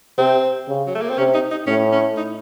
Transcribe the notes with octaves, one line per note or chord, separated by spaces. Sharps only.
C3 C4
C#3
F#3
A3
A#3
C4
C3 C#4
D#4
D#4
A2 C#4
C#4
D#4